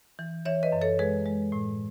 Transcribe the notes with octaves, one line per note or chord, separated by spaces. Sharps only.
E3
E3 C#5 E5
B4 D#5
F#2
A4 C#5
G#3 G#4 B4
G#3
A2